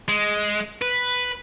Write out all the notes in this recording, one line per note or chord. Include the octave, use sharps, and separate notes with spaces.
G#3
B4